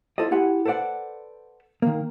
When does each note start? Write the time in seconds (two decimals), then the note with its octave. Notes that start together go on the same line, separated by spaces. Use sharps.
0.18 E4 F4 A4 C5 D5 D#5
0.31 E4 G4 F#5 G#5 C6
0.65 A4 B4 C5 D5 F#5
1.82 D#3 A#3